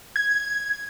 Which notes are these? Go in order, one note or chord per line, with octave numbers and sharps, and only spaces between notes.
G#6